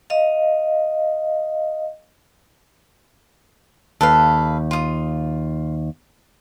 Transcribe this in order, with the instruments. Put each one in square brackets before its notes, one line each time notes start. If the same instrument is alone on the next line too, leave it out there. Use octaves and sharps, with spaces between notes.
[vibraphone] D#5 F5
[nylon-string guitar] D#2 [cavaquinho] A4 B4 F5
[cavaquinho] F4 D#6